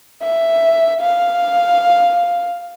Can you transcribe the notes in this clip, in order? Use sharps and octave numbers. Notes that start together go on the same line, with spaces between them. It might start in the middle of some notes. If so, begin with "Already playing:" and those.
E5
F5